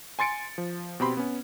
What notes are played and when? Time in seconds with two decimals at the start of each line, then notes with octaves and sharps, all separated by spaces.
0.19 G#5 C6 A6 C#7 D7
0.58 F3
1.00 B2 C4 G4 B5 C6
1.17 B3 C#4